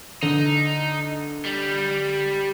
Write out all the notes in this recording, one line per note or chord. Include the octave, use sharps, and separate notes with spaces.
D3 D#4
G3